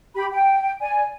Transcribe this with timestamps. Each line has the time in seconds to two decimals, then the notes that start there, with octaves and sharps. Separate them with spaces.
0.15 G4 B5
0.31 G5
0.80 D5 G#5